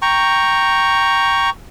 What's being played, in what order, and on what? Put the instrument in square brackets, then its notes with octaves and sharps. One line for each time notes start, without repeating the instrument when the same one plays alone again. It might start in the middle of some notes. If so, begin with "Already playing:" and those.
[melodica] G5 A#5 C#6